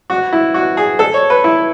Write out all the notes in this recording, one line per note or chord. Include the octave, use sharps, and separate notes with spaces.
F#4
E4
F#4
G#4
A4
C#5
B4
E4